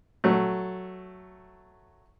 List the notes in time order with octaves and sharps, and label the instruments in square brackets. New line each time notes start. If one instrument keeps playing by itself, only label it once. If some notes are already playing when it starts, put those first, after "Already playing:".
[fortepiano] F#3 A3